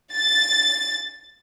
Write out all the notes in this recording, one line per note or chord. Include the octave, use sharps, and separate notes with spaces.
A6